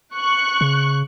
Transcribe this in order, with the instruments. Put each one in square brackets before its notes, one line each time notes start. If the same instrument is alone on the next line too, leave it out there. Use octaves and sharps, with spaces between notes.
[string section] C#6 F#6
[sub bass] C#3